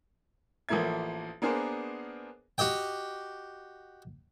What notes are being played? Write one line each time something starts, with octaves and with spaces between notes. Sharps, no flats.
A1 F3 A3 A#3 E5 G#6
A#3 B3 D4 G#4 A#4 C5
F#4 G4 D#5 G5